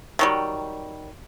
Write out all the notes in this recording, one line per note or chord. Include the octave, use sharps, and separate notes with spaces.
D#3 F#3 G3